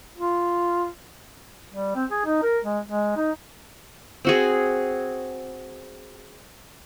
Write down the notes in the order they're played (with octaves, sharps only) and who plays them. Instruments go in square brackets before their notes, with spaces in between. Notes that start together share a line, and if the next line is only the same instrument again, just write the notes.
[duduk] F4
G3
C4
G#4
D#4
A#4
G#3
G#3
D#4
[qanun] C4 F#4 G#4